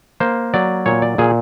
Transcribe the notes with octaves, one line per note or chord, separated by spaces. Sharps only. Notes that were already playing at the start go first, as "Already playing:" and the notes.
A#3 C5
F#3 D5
A#2 C#5
D5
A#2 G#4